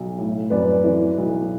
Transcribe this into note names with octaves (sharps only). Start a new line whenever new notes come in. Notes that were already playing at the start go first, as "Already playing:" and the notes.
Already playing: B1
A2
F#2 B4 D5
E3
B1